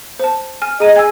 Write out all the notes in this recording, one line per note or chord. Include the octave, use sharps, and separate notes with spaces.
C5 A5
G#5 F6
G#4 D#5 A#5 D#7
G#5 E6 G#6